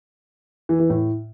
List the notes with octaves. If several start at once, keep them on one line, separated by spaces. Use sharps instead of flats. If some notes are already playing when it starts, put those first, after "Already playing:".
E3
E3
A2